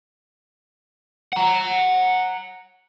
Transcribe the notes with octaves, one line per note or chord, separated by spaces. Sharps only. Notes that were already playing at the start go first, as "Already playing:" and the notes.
F#5 A#5